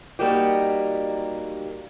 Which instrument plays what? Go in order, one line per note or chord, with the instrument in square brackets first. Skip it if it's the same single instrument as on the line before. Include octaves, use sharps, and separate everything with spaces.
[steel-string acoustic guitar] G3 A#3 D#4 F#4 G4